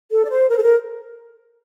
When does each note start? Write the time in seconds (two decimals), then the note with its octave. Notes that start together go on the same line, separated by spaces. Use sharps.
0.11 A4
0.25 D5
0.29 C5
0.49 A#4
0.57 A4
0.62 A#4